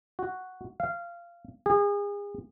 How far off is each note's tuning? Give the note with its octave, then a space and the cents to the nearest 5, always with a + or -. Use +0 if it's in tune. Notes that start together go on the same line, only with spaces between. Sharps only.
F#4 +0
F5 -20
G#4 -35